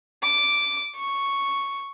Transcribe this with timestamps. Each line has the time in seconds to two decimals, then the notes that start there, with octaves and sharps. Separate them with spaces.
0.23 D6
0.96 C#6